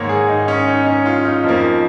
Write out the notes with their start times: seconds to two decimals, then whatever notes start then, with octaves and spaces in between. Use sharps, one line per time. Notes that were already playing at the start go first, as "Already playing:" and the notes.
Already playing: G#2 D#3 A#3 C#5
0.09 G#4
0.29 D#4
0.48 C#4
0.67 D#4
0.86 C#4
1.06 F4
1.25 D#4
1.44 F2 F3 A#3